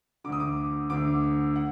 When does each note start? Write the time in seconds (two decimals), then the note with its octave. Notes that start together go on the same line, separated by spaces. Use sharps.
0.24 D3 D6
0.29 D2 D#6
0.40 D6
0.90 D2 D3 D6
1.55 F#5